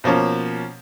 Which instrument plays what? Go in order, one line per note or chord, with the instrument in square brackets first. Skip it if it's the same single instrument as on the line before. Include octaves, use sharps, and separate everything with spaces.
[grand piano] B2 F3 A#3 C#4